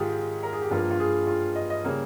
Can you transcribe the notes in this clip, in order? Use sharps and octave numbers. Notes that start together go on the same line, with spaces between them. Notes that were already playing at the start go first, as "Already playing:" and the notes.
Already playing: G#2 D#3 G#3 F4 G4 G#4
A#4
G#4
G4
G2 F3 A#3 F4
F4
G#4
F4
D#5
D#5
C#3 G3 A#3